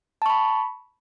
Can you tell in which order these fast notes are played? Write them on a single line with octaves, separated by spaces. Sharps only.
A5 C#6 B5